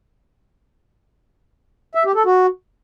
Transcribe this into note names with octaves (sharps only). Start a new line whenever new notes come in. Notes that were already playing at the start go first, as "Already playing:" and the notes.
E5
G4
A4
F#4